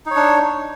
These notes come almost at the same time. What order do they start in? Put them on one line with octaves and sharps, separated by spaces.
D#4 C#5 D4